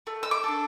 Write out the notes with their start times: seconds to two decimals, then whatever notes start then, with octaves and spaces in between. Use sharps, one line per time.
0.07 A3
0.23 E6
0.31 D6
0.43 D4 A4